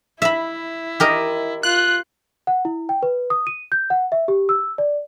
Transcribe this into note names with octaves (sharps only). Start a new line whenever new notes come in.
E4 E5 B5
G4 A#4 D#5
F4 F#6
F#5
E4
G5
B4
D#6
D#7
G6
F#5
E5
G4
E6
D5